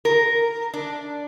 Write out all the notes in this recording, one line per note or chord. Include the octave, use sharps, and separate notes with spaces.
A#4
D4